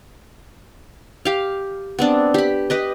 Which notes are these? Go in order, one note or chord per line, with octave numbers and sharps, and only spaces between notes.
G4 F5
B3 C4 D4
G4 B5
G4 B4 D#5